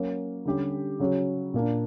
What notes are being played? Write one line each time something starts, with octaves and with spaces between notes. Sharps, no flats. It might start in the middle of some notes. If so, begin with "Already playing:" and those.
Already playing: F#3 A#3 C#4
D3 G3 C#4 G4
C#3 F#3 C#4 F#4
A#2 A#3 D4